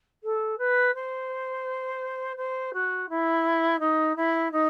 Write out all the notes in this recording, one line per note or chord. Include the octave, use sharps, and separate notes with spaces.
A4
B4
C5
C5
F#4
E4
D#4
E4
D#4